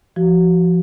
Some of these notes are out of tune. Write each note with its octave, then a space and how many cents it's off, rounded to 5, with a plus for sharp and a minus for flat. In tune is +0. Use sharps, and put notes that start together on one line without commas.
F3 -15 F#4 +25